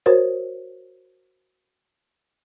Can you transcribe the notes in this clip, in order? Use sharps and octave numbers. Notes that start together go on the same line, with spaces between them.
F#4 A#4 C5 C#5